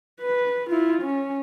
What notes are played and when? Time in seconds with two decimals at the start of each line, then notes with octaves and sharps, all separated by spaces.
0.21 B4
0.70 E4 F4
1.02 C#4